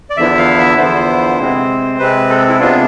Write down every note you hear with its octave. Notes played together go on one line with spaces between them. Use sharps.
D5
E2 D3 F3 B3 E4 E5
F5
E5
E2 D3 F3 B3 E4 C5
C3 G#3 C4
C3 G#3 C4 B4
A4
E4
C3 G#3 B3 D4 F4